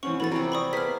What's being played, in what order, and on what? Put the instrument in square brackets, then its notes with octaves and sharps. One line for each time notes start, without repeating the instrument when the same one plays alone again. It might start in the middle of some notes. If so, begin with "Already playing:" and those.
[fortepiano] E3 C4 C#4 [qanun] F#5 [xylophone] C#6
[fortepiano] E3 F#4 [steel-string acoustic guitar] B3 C#4 A4 [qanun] C#5 [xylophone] B5 A6
[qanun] C3 G3 G4 [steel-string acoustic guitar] F3 E5 A#5
[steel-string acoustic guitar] C5 D5 [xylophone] B5 C#6 D#6
[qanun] A#3 B3 E4 [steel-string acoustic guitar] G#4 B4 A5 [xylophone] F6 B6